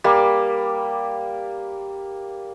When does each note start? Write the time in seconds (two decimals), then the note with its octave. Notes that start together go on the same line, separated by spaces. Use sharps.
0.04 G3 A#3